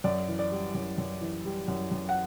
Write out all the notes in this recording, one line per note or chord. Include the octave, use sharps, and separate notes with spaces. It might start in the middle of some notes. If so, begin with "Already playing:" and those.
F#2 D5
E3
D5
G3
F#2
F#2
E3
G3
F#2
F#2
F#5